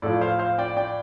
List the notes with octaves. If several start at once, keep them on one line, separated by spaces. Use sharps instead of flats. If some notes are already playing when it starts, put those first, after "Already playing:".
A2 F3 A4 D5
C5 F5
C5 F5
D5 G5
D5 G5